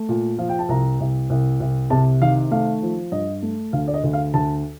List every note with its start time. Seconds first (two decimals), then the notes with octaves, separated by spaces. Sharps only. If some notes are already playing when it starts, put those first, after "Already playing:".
Already playing: A3
0.09 A#2
0.38 F3 F5
0.49 G5
0.59 A5
0.69 C2 A#5
1.00 C2
1.30 C2
1.60 C2
1.90 C3 A5
2.21 D#3 F5
2.51 A3 F5
2.82 F3
3.12 G2 D#5
3.42 A3
3.73 D2 F5
3.88 D5
3.94 D#5
4.04 D2
4.13 F5
4.34 D2 A5